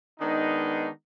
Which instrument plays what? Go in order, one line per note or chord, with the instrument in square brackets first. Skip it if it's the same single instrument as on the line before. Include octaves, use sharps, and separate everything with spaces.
[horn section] D#3 G#3 B3 D4 D#4